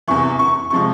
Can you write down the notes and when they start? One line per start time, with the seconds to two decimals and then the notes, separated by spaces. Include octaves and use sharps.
0.08 E2 C3 E3 C#6
0.39 C#6
0.70 C3 F3 G#3 C#6